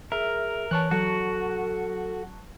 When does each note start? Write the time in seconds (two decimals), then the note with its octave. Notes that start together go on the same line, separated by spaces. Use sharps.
0.12 G#4 A#4 E5
0.71 E3 C#5 A5 C#6 F#6
0.91 F#3 F#4 A4